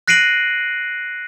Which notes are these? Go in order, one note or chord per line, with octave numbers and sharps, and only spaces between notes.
F#6 A#6 C7 D7 D#7 F#7